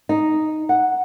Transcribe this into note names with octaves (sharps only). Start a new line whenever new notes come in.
D#4
F#5